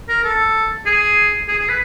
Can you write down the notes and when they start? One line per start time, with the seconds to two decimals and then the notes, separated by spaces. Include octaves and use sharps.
0.09 A#4
0.24 A4
0.86 G#4
1.48 G#4
1.59 G#4
1.68 B4